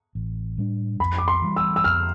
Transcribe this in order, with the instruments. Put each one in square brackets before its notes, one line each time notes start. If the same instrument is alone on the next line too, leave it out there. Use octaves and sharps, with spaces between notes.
[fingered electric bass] A1
A2 G3 D4
[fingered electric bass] F2 [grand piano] B5
[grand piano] D6
C6
[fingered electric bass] E3 G3
[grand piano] E6
E6
[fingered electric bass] F2 [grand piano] F6